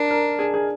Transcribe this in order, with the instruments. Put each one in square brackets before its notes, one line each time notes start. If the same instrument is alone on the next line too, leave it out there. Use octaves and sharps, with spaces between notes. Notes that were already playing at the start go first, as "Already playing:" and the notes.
Already playing: [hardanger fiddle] D4 [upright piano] A#4
[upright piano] A#4
G#4
G#4